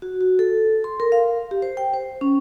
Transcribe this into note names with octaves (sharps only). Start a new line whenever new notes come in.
F#4
F#4
A4
C6
A#4
F5
G4
C5
G5
C5
C#4